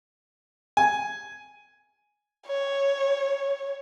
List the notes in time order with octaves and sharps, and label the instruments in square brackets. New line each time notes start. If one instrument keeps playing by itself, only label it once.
[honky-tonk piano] G#5
[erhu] C#5